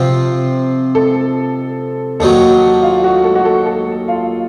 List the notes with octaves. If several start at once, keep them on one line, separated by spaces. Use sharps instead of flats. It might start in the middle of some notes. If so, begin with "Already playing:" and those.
Already playing: C3 F3 C4
A4
D#2 D#3 F#3 A4
F4
F#4
A4
F#4
A4
A4
F4